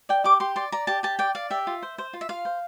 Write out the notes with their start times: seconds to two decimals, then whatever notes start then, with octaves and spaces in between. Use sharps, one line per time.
0.09 D5 G5
0.24 G4 D6
0.40 G4 C6
0.56 D5 C6
0.72 D5 A#5
0.87 G4 A5
1.03 G4 A5
1.19 D5 G5
1.35 D5 F5
1.50 G4 E5
1.67 F4
1.82 C5
1.98 C5
2.13 F4
2.21 E5
2.29 F4 F5
2.45 C5